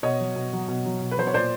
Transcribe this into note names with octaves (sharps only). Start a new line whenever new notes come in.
B2 C#5 D#5
F#3
B2
F#3
B2
F#3
B2
B4
F#3 C5
C#5
A#2 C5 D5